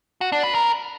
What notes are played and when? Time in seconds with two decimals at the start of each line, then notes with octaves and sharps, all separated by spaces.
0.21 F#4
0.32 D4
0.43 B4
0.55 A#4